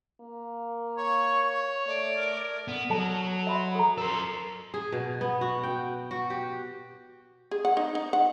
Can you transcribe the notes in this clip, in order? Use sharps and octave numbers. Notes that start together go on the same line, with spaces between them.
A#3
C#5 C#6
A3 D5
A#4
B3
F#3 A4 A5
E5 B5 C6
A4 A#5
A4 A#4 C5
G#4
B2
B3
F#4
G5
F#4
G4
G#4
F#5
D#4
D#4
F#5